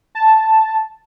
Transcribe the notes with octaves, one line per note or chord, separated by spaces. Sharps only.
A5